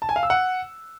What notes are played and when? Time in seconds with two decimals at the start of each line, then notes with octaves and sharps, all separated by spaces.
0.02 A5
0.09 G#5
0.16 F5
0.23 E6
0.30 F#5